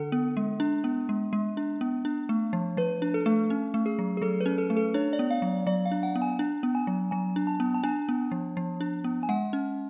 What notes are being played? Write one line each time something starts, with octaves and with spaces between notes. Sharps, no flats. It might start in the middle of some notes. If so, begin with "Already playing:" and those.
Already playing: D3 D4 A4
B3
G#3
D4
B3
G#3
G#3
D4
B3
D4
A3
F3
F3 B4
D4
A4
A3
C#4
A3
G#4
F#3
G#4
F#3 A4
B4
C#4
A4
A3
A4
D4 C#5
D5
B3
F5
F#3
F#3 D5
F5
D4
F#5
B3
G#5
D4
B3
G#5
F#3
F#3 G#5
D4
A5
B3
A5
D4 G#5
B3
F3
F3
D4
B3
G#5
G#3 F#5
C#4